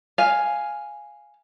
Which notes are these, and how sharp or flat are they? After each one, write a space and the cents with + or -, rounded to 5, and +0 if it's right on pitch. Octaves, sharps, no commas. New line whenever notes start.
F5 +0 G#5 +0